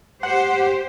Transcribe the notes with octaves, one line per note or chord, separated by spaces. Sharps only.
G4 C5 F#5